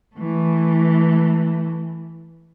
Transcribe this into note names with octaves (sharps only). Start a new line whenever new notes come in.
E3 A3